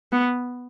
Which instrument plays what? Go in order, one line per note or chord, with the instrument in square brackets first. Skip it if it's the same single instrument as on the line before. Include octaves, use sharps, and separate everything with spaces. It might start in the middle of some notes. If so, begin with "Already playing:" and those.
[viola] B3